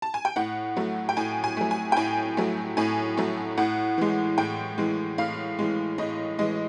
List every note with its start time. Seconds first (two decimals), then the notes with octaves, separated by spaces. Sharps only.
0.02 A5
0.14 G#5
0.25 G5
0.36 A2 F#5
0.77 F#3 A3
1.09 G5
1.17 A2 G#5
1.44 G#5
1.57 F#3 A3
1.71 G#5
1.92 G5
1.97 A2 G#5
2.37 F#3 A3
2.77 A2 G#5
3.17 F#3 A3
3.58 A2 F#5
3.98 E3 G#3
4.38 A2 G5
4.78 E3 G#3
5.18 A2 F5
5.59 E3 G#3
5.98 A2 D#5
6.39 E3 G#3 D#5